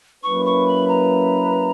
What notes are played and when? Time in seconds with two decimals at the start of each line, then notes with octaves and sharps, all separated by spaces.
0.23 F#3 A#3 C#4 E4 B4 C#6
0.45 C#6
0.68 B5
0.88 A#5